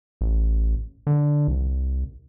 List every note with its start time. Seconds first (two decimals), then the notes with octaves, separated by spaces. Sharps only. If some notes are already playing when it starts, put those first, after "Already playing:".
0.21 A1
1.07 D3
1.48 C2